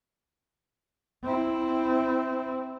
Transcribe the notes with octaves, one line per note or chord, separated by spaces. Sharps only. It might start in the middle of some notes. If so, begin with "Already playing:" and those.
C4 E4